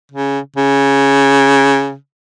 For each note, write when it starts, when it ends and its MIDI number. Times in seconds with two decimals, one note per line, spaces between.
0.12 0.39 49
0.57 1.95 49